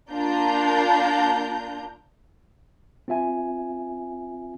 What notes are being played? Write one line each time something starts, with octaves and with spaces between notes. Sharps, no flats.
A#3 D4 F4 A#5 G6
C4 F4 E5 G#5